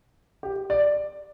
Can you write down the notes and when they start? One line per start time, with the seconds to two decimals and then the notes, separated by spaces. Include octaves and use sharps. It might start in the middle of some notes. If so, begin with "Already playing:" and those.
0.43 G4
0.70 D5